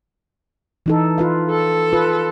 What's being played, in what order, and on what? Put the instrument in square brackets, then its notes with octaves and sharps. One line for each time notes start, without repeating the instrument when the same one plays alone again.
[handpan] E3 D#4 A4
F4 B4 F5
[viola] A4
[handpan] F4 B4